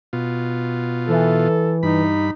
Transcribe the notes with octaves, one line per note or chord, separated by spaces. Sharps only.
B2 F4
E3 A4
G2 D#4 B5